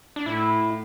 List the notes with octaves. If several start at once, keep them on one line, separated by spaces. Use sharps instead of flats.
D4
A2 E4